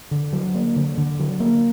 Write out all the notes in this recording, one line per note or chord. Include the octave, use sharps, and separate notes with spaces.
D3
F#3
A#3
D3
D3
F#3
A#3